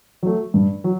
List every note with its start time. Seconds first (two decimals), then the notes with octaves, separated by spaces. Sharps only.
0.23 F#3 A3
0.54 G2
0.84 F#3